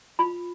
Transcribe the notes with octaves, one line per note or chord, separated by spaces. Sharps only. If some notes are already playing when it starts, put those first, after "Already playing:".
F4 B5